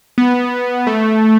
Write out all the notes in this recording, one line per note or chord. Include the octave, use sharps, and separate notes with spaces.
B3
A3